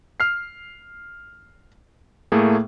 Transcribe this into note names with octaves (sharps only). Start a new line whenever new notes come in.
F6 C7
A2 A3 A#3 G#4